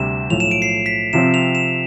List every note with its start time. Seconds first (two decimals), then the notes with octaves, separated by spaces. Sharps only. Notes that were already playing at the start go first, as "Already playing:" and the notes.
Already playing: D2 C3 G3 E7
0.30 B1 A2 F3 F7
0.40 E7
0.51 D7
0.62 C7
0.86 B6
1.13 C3 F3 C4 E7
1.34 F7
1.55 E7